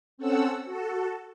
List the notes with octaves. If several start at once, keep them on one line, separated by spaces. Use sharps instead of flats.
C4 C#4 A4 F#5 E6
F#4 A4